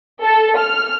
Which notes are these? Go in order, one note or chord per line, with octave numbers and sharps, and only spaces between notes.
A4
F6